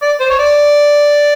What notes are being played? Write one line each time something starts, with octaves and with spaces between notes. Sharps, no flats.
D5
C5
C#5
D5